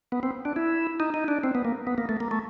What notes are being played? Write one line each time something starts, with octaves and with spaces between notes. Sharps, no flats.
B3
C4
D4
E4
D#4
D#4
D4
C4
B3
A#3
B3
A#3
A3
A#3
A3